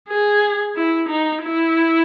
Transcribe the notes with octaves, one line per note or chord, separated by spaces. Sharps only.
G#4
E4
D#4
E4